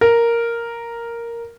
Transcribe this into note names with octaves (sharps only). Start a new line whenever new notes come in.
A#4